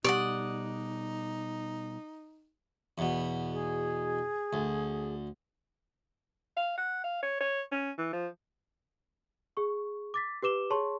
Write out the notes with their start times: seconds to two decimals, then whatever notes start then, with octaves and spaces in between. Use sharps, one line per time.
0.04 B2 G3 D#4 G4 D5 D#5 F#5
2.98 E2 B2
3.53 G#4
4.53 D2
6.57 F5
6.78 F#5
7.04 F5
7.23 C#5
7.41 C#5
7.72 C#4
7.98 E3
8.13 F3
9.57 G#4 C#6
10.14 D6 A6 B6
10.42 G4 B4 D6 E7 G7
10.70 G#4 C#5 A5 C6 C#6